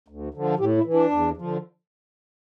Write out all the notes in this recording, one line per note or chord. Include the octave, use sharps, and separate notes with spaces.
D2
D3 F3
A2 G4
E4
E3
D4
E2
D3 F3